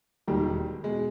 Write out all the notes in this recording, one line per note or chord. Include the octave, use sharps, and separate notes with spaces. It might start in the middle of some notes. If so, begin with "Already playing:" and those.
E1 D#2 D#3 G3
B2 G#3